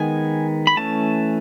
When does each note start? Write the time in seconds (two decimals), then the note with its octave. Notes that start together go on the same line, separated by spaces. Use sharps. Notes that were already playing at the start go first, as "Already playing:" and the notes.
Already playing: D#3 G#3 B3 G#5
0.67 B5
0.77 E3 A3 C#4 A5